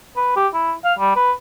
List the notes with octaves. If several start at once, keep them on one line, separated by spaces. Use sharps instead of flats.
B4
G4
E4
F5
G3
B4